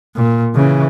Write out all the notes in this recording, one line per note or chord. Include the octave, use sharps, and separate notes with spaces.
A#2
C#3 E3